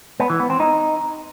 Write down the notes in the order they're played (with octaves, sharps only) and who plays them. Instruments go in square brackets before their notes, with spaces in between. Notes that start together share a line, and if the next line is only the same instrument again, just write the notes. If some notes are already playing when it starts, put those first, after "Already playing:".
[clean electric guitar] B3
E3
B3
C4
D#4